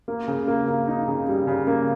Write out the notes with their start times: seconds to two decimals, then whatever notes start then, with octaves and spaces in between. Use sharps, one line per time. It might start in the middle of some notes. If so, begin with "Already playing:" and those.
0.08 A#3
0.28 C#3
0.48 A#3
0.68 A#3
0.88 D#4
1.08 C#3
1.28 G3
1.47 C#3
1.67 A#3